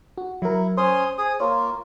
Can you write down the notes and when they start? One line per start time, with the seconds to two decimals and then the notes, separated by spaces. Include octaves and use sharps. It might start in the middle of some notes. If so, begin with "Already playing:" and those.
0.18 F#4
0.42 F#3 E4 A#4
0.77 C#4 C5 C6 D#6
1.18 G#4 D#6
1.40 A#3 F4 C#5